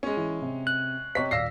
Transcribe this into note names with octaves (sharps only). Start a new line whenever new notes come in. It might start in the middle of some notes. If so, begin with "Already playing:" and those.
G#3 C#4
E3
C3
F#6
C3 C#5 D#5 C#6 B6
D#1 D5 F5 E6 A#6 C7